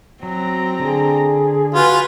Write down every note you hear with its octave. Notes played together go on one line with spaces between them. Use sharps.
F#3 C4 A#5
D3 G#4
F4 F#4 B4 G#5